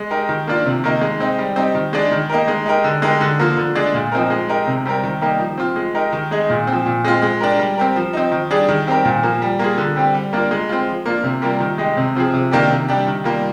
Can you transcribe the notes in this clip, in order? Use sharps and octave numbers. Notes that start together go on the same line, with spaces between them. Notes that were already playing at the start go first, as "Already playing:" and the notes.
Already playing: G#3
D#4 G4 A#4
D#3
A#3 D4 F4
C3
D#3 A#3 D#4
G#3
C4 D#4
G3
C4 D#4 G4
D#3
G#3 D4 G#4
D#3
A#3 D#4 G4 A#4
G#3
D#4 G4 A#4
D3
G#3 D#4 G4 A#4
D3
F3 A#3 F4
D3
G#3 D4 G#4
A#2
F3 C4 D#4 A#4
G#3
D#4 G4 A#4
C3
G3 C4 G4 A#4
D#3
G3 A#3 D#4 G4
F3
C4 F4
G#3
D#4 G4 A#4
D#3
G#3 D#4 G#4
A#2
F3 C4
A#2
G#3 C4 F4
G#3
D4 G4 A#4
G3
C4 G4 A#4
F3
C4 D#4
D#3
G3 D4 G#4
D#3
G3 C4 G4 A#4
A#2
F3 A#3
G3
A#3 F4 G#4
D3
G3 C4 G4
G3
A#3 D4 F4 A#4
G#3
C4 F4
F3
A#3 D4 F4
C3
G3 A#3 F4 A#4
D#3
G#3 D#4 G4
C3
F3 C4 F4 G#4
C3
D#3 A#3 D4 G4
C3
G3 D4 G4
D#3
G3 A#3 F4